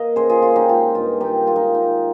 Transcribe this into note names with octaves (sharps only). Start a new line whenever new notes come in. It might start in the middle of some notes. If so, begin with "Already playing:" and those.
Already playing: A#3 D#5 F5
C#3 G#4 C5
F4 G#4
C#3 F4
D#4 G4
G#3 F4
G2 F4
D#3 D#4 G4
G#3 F4
D#4
G3 D#4